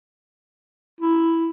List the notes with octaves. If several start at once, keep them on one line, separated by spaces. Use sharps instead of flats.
E4